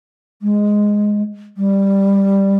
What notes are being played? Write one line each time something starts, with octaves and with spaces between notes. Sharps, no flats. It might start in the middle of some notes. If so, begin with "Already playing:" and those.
G#3
G3